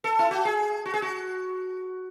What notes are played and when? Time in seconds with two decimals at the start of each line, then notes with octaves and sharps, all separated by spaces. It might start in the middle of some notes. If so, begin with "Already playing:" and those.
0.04 A4
0.19 E4
0.31 F#4
0.45 G#4
0.85 F#4
0.94 G#4
1.02 F#4